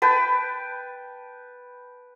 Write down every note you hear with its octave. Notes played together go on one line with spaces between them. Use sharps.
B4 G5 A5